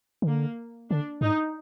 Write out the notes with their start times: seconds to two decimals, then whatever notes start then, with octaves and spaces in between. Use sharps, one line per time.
0.22 D#3
0.27 D3 A#3
0.90 D3 D4
1.21 G#2 D#4